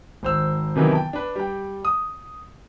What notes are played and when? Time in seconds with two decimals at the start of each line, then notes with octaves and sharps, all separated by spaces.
0.23 G#1 C5 E6
0.76 C3 D#3 E3 F#3 B3
0.92 G5 A5
1.13 D4 B4
1.36 G3 G5
1.85 D#6